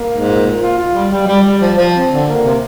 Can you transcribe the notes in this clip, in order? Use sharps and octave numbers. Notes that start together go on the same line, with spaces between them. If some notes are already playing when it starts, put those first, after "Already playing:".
Already playing: A#3
G#2
A#2
A#2
F4
F4
G3
G3
G3
G3
F3
F3
C4
D3
A#3
C3